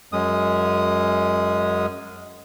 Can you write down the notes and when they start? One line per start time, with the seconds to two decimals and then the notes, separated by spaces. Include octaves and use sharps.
0.12 F#2 G#3 D#6